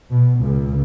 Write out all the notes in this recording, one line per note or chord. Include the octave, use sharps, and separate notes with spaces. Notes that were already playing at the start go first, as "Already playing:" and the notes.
B2
C#2